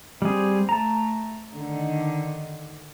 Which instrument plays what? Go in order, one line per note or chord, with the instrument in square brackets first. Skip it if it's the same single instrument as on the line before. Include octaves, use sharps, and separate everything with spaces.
[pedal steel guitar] G3 G#4 [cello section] C4
[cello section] A3 [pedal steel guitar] A5 A#5
[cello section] D3 D#3